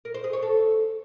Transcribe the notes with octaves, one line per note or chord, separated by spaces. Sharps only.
A#4
C5
G#4
C#5
A4